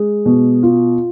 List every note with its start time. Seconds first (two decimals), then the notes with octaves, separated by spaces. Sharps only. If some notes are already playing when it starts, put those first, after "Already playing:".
Already playing: G#3
0.26 B2
0.63 F4